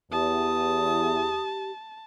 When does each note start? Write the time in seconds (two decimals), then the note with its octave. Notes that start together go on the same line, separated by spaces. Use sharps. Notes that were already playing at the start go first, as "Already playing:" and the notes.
0.12 E2 G4 A5 D#6